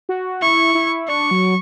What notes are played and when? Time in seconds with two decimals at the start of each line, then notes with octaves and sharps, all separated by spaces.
0.09 F#4
0.42 E4 C#6
0.75 E4
1.08 D4 C#6
1.31 F#3